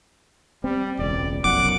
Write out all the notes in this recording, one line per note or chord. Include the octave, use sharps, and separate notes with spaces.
G3 C4
E1 C#2 D5
F1 B1 F#2 F#5 D6